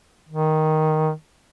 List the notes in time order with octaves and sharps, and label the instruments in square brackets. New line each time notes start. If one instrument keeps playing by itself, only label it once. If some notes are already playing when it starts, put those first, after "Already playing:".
[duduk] D#3